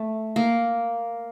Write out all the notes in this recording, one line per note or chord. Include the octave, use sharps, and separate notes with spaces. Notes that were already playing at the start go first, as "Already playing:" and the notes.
Already playing: A3
A#3